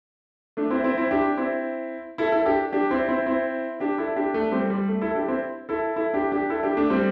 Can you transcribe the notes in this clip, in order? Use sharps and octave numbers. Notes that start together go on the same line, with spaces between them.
A3 D4
C4 E4
C4 E4
C4 E4
D4 G4
C4 E4
E4 A4
E4 A4
D4 G4
D4 G4
C4 E4
C4 E4
C4 E4
D4 G4
E4 A4
D4 G4
A3 D4
G3 C4
G3
A3
E4 A4
D4 G4
C4 E4
E4 A4
E4 A4
D4 G4
D4 G4
E4 A4
D4 G4
A3 D4
G3 C4